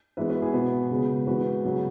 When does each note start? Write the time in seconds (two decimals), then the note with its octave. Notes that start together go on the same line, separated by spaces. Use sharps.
0.17 E3 G#3 B3 B4 E5
0.30 F#4 B4
0.42 E4 G#4
0.53 B2 B3 F#4 B4
0.90 C#3 G#3 B3
1.27 E3 G#3 B3 F#4 B4
1.64 C#3 F#3 B3